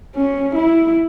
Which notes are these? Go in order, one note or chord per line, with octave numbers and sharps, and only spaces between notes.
C#4
E4